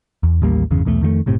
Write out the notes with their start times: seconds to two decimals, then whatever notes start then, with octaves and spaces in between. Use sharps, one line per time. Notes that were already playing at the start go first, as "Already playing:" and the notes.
0.23 E2
0.42 A1 D#2 G3 A#3
0.71 G1 E2 C#3
0.85 B1 E2 C#3 A3
1.01 F2 D#3 F#3 A3
1.26 F#1 A2 C3